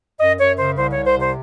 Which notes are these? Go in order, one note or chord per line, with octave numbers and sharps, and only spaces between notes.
F#2 D#5
F#2 C#5
C#3 C5
C2 C5
C2 C#5
C5
C3 C5